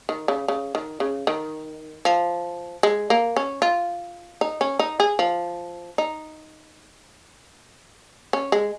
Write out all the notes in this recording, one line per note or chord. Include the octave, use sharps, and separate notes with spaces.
D#3
C#3
C#3
D#3
C#3
D#3
F3
G#3
A#3
C#4
F4
D#4
C#4
D#4
G#4
F3
D#4
C#4
G#3